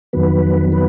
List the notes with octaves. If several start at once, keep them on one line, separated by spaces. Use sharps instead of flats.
F2 D#3 F#3 B3 B4
B3 B4